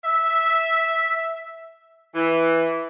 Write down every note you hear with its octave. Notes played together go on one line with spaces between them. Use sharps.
E5
E3